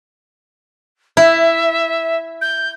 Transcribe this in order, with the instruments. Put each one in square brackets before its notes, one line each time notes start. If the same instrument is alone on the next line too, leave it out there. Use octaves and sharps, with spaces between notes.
[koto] E4 [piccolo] E5
[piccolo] G6